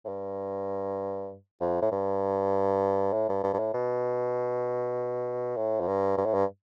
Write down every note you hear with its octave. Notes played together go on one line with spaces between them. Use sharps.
A2
G2
F2
A2
G2
A2
G2
G2
G2
A2
B2
A2
F2
G2
G2
A2
G2